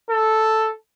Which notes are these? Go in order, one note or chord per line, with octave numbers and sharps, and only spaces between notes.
A4